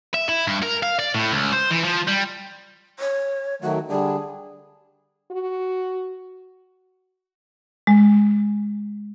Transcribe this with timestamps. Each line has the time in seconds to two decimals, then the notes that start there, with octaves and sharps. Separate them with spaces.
0.14 E5
0.29 E4
0.47 G2
0.63 A#4
0.83 F5
0.99 D5
1.15 A2
1.32 C#2
1.52 C5
1.71 E3
1.84 F3
2.07 G3
2.99 C#5
3.62 D#3 F#3 A3 F#4
3.89 D3 G3 D4 G#4
5.31 F#4
7.87 G#3